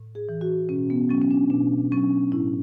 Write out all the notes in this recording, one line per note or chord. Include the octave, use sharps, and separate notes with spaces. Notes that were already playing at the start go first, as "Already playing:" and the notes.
Already playing: A2
G#4
E3
F#4
B2 C#4
B3
F#3 C#4
C#4
D4
B2 D4
F#3 C#4
A2 E4